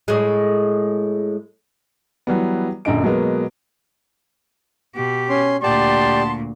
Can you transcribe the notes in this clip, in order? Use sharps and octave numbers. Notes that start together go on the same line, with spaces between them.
A2 G#3
E3 F#3 G3 B3
A#1 F#2 D3 D#5 D7
B2 F#3 G#3 A#3 B3
B2 G4
C#4 C6
D2 A#2 B3 G4 D5 A5 C6